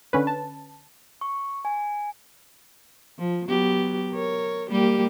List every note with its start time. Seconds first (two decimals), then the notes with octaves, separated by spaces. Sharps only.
0.13 D3 C#4 B4
0.27 A5
1.21 C#6
1.65 G#5
3.19 F3
3.48 F#3 B3 G4
4.12 A#4 C#5
4.70 G3 A#3 G4